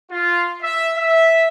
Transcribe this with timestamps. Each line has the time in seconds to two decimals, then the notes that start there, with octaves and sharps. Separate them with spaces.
0.11 F4
0.62 E5
0.97 E5